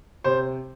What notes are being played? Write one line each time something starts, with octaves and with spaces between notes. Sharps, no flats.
C3 C5